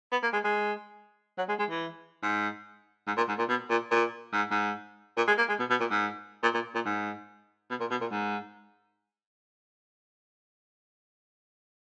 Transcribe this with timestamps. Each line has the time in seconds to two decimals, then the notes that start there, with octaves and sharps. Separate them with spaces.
0.12 B3
0.23 A#3
0.33 G#3
0.44 G#3
1.38 F#3
1.49 G#3
1.59 G#3
1.70 E3
2.22 G#2
3.07 G#2
3.17 A#2
3.28 G#2
3.38 A#2
3.49 B2
3.70 A#2
3.91 A#2
4.33 G#2
4.51 G#2
5.17 A#2
5.27 G#3
5.38 A#3
5.49 G#3
5.59 B2
5.70 B2
5.80 A#2
5.91 G#2
6.43 A#2
6.54 A#2
6.75 A#2
6.86 G#2
7.70 B2
7.80 A#2
7.91 B2
8.01 A#2
8.11 G#2